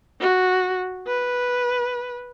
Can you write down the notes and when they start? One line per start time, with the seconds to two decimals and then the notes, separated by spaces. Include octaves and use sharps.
0.20 F#4
1.08 B4